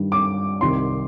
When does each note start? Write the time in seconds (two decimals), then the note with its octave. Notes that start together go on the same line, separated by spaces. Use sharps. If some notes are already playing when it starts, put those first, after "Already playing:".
Already playing: G2 D#3 G3
0.12 D6
0.61 C2 C3 D#3 C6